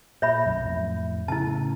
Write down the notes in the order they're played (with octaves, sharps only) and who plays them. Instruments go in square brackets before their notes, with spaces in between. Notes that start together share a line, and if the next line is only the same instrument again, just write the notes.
[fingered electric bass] A#2 [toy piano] C#5 E5 B5
[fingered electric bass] B1 F#2
F2 A2
[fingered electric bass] A2 C#3 [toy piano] E4 A5